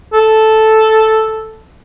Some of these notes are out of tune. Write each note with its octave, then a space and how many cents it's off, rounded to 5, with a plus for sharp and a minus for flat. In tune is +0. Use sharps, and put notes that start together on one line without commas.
A4 -5